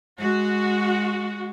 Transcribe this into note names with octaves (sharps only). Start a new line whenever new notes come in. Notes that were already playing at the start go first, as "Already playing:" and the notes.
G#3 F#4